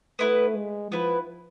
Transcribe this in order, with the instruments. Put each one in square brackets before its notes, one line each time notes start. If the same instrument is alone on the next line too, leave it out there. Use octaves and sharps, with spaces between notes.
[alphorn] A3 [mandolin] B3 E4 B4
[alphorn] G#3
[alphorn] F3 [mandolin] B3 E4 B4